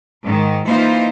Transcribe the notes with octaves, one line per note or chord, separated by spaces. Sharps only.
G#2 D#3
E3 A#3 D#4 F4 C5